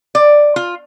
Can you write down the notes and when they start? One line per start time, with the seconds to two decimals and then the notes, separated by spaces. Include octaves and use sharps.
0.15 D5
0.56 F4